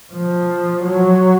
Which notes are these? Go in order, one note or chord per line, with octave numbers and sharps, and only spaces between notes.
F3
F#3